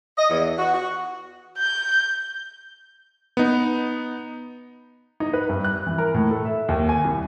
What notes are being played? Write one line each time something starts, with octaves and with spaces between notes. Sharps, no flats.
D#5
E2
F#4
F#4
G6
B3 D#4
D#4
B4
G2
F#6
E3
A#4
A2
A4
E5
D#2
G#5
C2